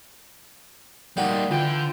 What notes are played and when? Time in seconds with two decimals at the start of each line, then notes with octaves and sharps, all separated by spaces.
1.17 G3 A#3 D#4 F#4 G4 D5
1.51 D3 E3 F4 G5